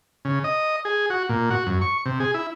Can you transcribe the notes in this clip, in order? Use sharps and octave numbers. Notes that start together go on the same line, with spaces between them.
C#3
D#5
G#4
F#4
A#2
F#4
F#2
C#6
C3
G#4
E4